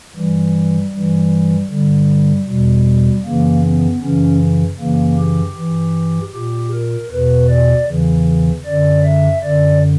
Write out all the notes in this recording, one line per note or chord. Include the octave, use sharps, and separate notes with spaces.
G2 E3 G3
G2 G3
E3
G2 D3 G3
E2 B2 G3
F#2 C#3 E3 A#3
B3
F#2 C#3 E3 C#4
F#2 C#3 E3 A#3
G4
G2 E3
A#2 G4
A#4
E2 B2 B4
D5
E2 C#3 E3
F#2 D3 D5
E5
F#2 D3 D5